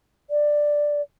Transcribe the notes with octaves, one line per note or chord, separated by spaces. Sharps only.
D5